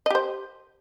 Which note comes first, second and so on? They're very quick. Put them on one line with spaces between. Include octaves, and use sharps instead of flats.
D#5 G4 C5